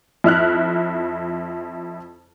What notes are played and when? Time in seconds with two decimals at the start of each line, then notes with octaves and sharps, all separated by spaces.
0.24 F2 E4 F6 F#6